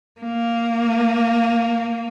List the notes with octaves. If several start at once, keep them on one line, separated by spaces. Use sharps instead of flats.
A#3